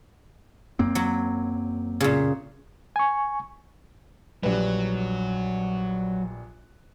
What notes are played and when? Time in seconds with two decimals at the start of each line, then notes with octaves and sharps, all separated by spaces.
0.79 F#2 A#3 C4
0.95 F#3
2.01 A#2 C#3
2.96 G#5 C#6
4.43 A#1 F#3 G3 B4